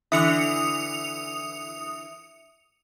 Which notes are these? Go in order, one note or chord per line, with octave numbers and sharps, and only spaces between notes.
D3 E3 E5 D#6 C#7 F7